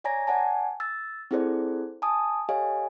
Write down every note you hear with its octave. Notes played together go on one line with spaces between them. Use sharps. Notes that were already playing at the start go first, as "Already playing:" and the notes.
C#5 D5 G#5 A#5 A#6
D5 F#5 G#5 A5
E6 A6
C4 E4 G#4 A4 C5 D5
G#5 A5 D#6
G4 A4 C#5 D#5 F5 G#5